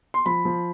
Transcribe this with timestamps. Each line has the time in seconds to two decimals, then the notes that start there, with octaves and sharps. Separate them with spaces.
0.14 C6
0.26 F3 B5
0.45 F3